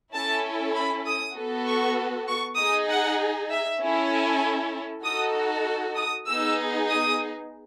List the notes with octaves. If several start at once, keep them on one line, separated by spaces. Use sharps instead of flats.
C#4 E4 A4 A5
B5
D#6
B3 F#4 A4
C#6
C#6
D#4 G#4 D#6
F#5
E5
C#4 E4 A4
G#5
D#4 F#4 A4 D#6
D#6
B3 D#4 G#4 E6
D#6